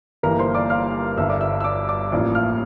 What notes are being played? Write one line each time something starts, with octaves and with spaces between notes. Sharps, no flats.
G1 G2 E3 A#3 A#4 A#5
C5 C6
D5 D6
F5 F6
G1 G2 D3 E5 E6
D5 D6
E5 E6
E6
D5 D6
D5 D6
A1 A2 F3 A#3 D5 D6
F5 F6